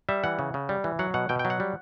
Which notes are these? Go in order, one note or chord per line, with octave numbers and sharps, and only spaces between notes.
G3 E5
E3 F#5
C#3
C#3
G3
E3
F#3 F#5
B2 F#5
B2 G5
G5
F#3
F#5
G3